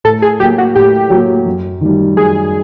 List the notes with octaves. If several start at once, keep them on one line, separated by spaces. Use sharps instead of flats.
A2 A4
G#4
F#3 A#3 G4
F#4
A2 G4
F#3 A#3
F#2
D#3 G3
F#2 G#4